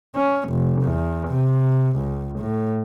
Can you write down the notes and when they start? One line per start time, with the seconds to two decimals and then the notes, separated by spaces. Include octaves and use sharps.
0.16 C#4
0.50 F1
0.82 E2
1.29 C3
1.97 C#2
2.39 A2